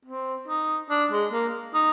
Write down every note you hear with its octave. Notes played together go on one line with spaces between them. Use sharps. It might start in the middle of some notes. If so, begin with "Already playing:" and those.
C4
D#4
D4
G#3
A#3
D#4